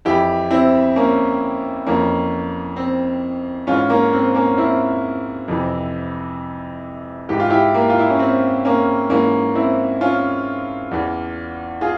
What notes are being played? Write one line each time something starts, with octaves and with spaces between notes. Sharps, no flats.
F2 E3 E4 G4
C4 E4
A#3 C#4
F2 E3 A#3 C#4
C4
G#2 E3 C#4 F4
A#3 C#4
C4
A#3 C#4
C4 E4
F2 C3 E3
G#2 E3 G4
F4
E4 G4
A#3
F4
E4
C#4
C4
A#3 C#4
G#2 E3 A#3 C#4
C4 E4
C#4 F4
E2 E3
F4 G#4